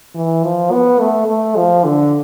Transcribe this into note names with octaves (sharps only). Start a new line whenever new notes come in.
E3
F3
B3
A3
A3
F3
D3